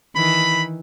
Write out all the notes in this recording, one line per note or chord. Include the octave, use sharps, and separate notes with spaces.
D#3 E3 B5